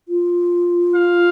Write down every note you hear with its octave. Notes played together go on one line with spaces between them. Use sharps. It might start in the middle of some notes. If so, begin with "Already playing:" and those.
F4
F5